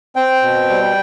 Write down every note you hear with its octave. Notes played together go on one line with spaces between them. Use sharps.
C4 G5
B2
G3